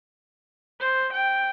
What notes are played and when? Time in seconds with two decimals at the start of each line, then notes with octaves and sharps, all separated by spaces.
0.80 C5
1.12 G5